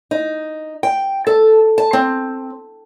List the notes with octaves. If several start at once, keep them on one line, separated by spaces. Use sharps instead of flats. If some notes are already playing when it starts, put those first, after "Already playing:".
D#4
G5
A4
A5
C4